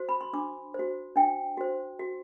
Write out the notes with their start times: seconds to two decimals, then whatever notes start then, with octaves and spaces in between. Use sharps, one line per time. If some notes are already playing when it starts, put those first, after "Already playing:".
Already playing: F#4 C5
0.09 B5
0.21 C6
0.33 D4 D6
0.74 F#4 C5
1.16 D4 G5
1.57 F#4 C5
1.99 F#4